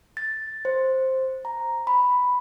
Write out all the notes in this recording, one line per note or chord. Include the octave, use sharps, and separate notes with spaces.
A6
C5
A#5
B5